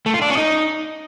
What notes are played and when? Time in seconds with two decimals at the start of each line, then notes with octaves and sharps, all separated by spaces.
0.06 A3
0.14 F4
0.22 D4
0.29 C#4
0.37 D#4